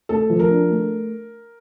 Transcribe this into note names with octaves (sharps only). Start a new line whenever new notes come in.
A3 A4
F3
A#4
D4
A3